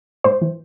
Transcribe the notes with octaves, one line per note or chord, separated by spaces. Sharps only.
G#2 C5
E3